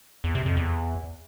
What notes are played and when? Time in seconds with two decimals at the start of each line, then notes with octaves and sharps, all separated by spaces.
0.24 E2
0.35 C3
0.46 F2
0.57 E2